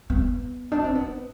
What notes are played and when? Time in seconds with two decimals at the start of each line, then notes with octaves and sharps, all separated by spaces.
0.10 B3
0.72 D4
0.84 C4
0.95 B3